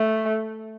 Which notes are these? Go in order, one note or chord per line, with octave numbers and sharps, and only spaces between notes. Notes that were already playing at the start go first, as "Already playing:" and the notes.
Already playing: A3